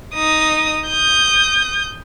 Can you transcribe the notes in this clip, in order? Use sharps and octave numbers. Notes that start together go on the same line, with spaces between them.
D#4 D#6
D#6 G6